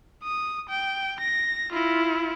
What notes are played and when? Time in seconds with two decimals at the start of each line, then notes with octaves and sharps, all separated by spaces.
0.23 D#6
0.69 G5
1.20 A#6
1.72 E4 F4